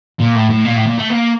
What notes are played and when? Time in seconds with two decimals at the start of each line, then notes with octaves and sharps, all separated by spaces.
0.20 A#2
0.35 A2
0.50 A2
0.65 A#2
0.76 A2
0.86 A#2
0.98 A3
1.10 A#3